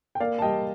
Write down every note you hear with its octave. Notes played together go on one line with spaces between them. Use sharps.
G5
A#3 D5 F5
A5
G3 D#5 G5